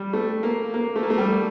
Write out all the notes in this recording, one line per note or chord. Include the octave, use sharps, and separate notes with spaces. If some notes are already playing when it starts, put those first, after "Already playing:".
Already playing: G3
A3
A#3
A#3
A3
A#3
A3
G3